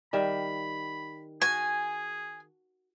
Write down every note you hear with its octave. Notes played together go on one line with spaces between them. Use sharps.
D#3 G3 E5 B5
F#4 G#4 G#5